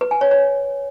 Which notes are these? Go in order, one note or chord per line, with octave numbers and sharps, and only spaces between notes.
B4
G#5
C#5
C#5